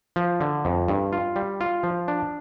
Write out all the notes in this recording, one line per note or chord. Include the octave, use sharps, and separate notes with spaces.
F3
D3
F2
G2
F4
G3
F4
F3
D4